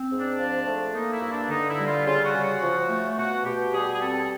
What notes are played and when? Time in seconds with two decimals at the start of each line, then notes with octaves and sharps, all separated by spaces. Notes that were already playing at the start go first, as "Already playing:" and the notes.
Already playing: C4
0.11 G#2
0.19 D4
0.38 F3
0.66 A3
0.94 A#3 D#4
1.12 E4
1.21 G2
1.32 D4
1.50 D3 D#4
1.69 E4
1.79 G3
1.87 F4
2.06 C#3 F4
2.25 F#4
2.33 C#3
2.43 F#4
2.61 F3
2.89 A3
3.18 B2 F#4
3.45 B2 G4
3.74 G3 G#4
3.94 G#4
4.01 C4 A4